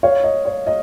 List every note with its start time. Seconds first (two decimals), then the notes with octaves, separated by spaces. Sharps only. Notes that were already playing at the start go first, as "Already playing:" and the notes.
0.03 C#5 F5
0.24 D#5
0.45 C#5
0.67 D#5